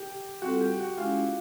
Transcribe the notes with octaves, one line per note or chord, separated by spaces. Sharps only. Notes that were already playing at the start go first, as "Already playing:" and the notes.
Already playing: G4
G3 C4 F4 F#4 A4
G4
F#4
G#3 C#4 E4 F4 G#4